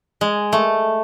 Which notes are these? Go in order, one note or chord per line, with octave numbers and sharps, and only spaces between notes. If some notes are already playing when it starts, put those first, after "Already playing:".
G#3
A3